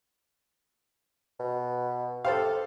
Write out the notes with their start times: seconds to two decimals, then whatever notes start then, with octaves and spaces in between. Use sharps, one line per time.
1.40 B2
2.25 G4 A4 C5 F5